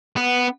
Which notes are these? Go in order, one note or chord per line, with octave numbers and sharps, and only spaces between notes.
B3